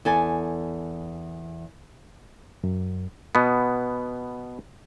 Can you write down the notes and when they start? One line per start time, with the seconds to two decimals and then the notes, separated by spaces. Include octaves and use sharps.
0.05 E2 A4 G#5
2.64 F#2
3.35 B2 B3